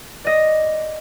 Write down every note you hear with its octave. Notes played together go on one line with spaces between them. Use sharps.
D5 D#5